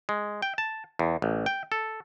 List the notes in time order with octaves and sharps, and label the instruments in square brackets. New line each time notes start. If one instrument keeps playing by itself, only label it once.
[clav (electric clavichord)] G#3
G5
A5
E2
A1
G5
A4